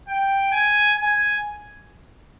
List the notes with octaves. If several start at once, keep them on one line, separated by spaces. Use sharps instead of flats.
G5
G#5
G#5